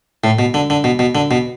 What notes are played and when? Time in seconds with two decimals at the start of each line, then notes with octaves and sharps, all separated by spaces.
0.24 A2
0.39 B2
0.54 D3
0.70 D3
0.84 B2
0.99 B2
1.15 D3
1.31 B2